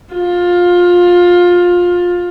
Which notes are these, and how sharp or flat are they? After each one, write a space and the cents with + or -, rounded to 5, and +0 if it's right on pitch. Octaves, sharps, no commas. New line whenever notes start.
F4 +20